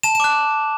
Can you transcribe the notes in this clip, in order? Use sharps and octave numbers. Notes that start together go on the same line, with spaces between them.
A5 E7
E7
D6 F#6